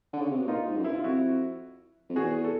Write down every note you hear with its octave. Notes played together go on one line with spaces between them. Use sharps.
D3
C#3
C3
B2
A#2 D#4 F4
G#2
F#2
G2 E4
F4
F2 E4 F#4
F2
E2 F#4 G#4
A4